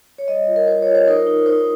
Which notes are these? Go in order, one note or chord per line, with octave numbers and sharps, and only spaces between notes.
C#5
G3 D#5
F4
A#4
F4 C5
F4 C#5
C5
D#4 A#4
D#4
D#4 C5